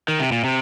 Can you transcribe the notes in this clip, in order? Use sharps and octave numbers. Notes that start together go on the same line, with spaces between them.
D#3
C3
A#2
C3